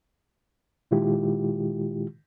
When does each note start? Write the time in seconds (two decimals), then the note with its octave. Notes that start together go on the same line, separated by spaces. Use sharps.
0.91 A#2 D#3 G#3 E4 F4 G4